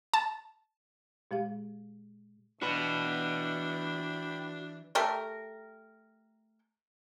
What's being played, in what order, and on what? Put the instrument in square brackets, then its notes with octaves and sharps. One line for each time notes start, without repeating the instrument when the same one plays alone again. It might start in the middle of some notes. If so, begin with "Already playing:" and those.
[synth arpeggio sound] A5
[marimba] A#2 G#3 G4 F5
[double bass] E3 [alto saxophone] D4 [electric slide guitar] F#4 B4 [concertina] G5 B5
[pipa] A3 G4 A4 A#4